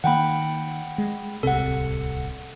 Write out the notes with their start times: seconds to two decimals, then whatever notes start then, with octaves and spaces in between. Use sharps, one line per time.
0.04 D#3 A#3 F#5 G5 B5
0.98 G#3
1.43 D1 C2 C3 A4 F#5